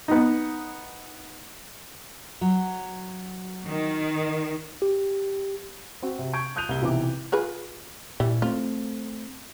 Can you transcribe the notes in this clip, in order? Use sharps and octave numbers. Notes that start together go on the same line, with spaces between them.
B3 D#4
F#3
D#3
G4
C4 F#4
C3
C#6 G6 G#6 D7
D#6 F#6 G6 D#7 F7
C2 G7
B1 C3 E3 D6
F4 G#4 B4
A#2 E3 G3
A3 C4 F4